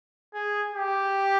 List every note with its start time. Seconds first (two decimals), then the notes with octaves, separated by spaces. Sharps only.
0.34 G#4
0.74 G4